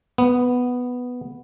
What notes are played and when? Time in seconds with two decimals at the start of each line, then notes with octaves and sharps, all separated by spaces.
0.18 B3